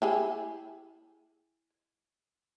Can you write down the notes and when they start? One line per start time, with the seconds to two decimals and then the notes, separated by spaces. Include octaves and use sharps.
0.02 E4 G4 G#4